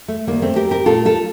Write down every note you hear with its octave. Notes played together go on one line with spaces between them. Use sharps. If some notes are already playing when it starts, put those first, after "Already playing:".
A3
D#2 D#3 G3 A#3
A3 C4
G4 A#4
G4 A#4
A#2 A3 F4 A4
F4 A4